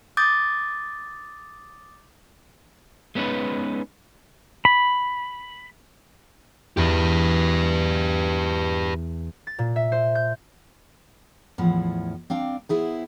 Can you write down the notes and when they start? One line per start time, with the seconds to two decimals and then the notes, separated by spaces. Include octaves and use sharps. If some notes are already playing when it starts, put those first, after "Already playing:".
0.17 D6 D#6 G6 A6
3.15 G#3 B3 C#4 D#4 B4
4.65 B5
6.77 E2 G4 B4
9.47 A6
9.58 A#2
9.76 E5
9.92 C5
10.15 G6
11.58 E2 A2 F3 E4 F#5
12.30 C4 D4 F5 G5
12.69 B3 E4 G#4 C5